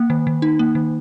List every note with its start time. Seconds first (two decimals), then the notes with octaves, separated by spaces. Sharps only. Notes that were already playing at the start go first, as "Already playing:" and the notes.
Already playing: A#3
0.10 D#3
0.27 D#3
0.42 D#4
0.59 A#3
0.75 D#3